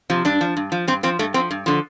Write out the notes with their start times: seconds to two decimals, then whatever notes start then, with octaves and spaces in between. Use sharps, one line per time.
0.10 C3 F3
0.25 G2 D4
0.41 F3
0.57 G2
0.72 F3
0.87 G2 C4
1.03 F3 C4
1.19 G2 A3
1.34 F3 C4
1.51 G2
1.66 D3 F3